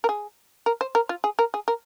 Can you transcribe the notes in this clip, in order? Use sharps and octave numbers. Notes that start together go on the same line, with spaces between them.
A#4
G#4
A#4
C5
A#4
F4
G#4
A#4
G#4
A#4